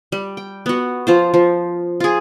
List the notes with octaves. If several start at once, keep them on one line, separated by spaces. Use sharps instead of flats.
G3
G5
B3 F#4
F3 F4 C5
F3
F4 G#4